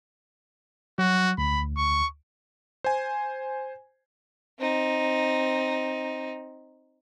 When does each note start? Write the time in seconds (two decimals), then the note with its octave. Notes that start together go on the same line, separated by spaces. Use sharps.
0.98 F#3 F#4
1.38 D2 B5
1.77 C#6
2.84 C5 G#5
4.59 C4 D#4